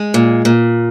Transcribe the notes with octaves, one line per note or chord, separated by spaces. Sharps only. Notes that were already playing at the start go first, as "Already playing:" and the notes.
Already playing: G#3
A#2
A#2